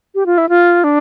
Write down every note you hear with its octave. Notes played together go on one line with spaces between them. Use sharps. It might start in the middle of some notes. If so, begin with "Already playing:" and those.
G4
F4
E4
F4
D4